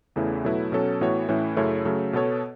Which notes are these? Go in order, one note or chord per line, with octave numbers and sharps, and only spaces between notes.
E2 C#3 E3 A3 E4
B2 F#3 A3 E4 B4
B2 F#3 C#4 A4
A2 E3 B3 F#4 C#5
A2 E3 C#4 E4
F#2 C#3 A3 E4 C#5
C#3 F#3 A3
B2 B3 A4 C#5